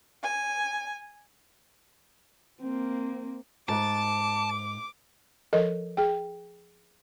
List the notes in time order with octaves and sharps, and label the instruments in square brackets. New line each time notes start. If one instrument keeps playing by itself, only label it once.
[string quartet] G#5
[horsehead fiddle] A#3 C4
[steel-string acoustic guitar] G#2 [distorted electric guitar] A5 [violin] D6
[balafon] F3 A4 A#4 D#5
G#4 G5